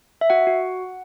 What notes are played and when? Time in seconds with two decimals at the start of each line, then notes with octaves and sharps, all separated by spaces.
0.21 E5
0.30 F#4 F#5
0.47 F#4